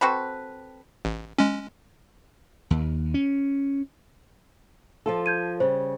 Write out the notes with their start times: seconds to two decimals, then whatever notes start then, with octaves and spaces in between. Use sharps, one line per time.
0.01 C4 F#4 A4 B4
1.05 A1
1.39 G#3 C#4
2.71 D#2
3.14 C#4
5.06 F3 F4 A4
5.26 G6 G#6 D#7
5.60 C#3 G3 C5